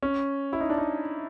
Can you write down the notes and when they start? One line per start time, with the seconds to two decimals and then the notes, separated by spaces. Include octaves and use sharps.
0.03 C#4
0.53 E4
0.60 D#4
0.70 D4
0.78 D#4